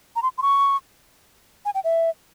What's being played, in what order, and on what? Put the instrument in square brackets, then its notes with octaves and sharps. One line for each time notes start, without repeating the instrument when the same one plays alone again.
[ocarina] A#5
C6
C6
C#6
G#5
G5
E5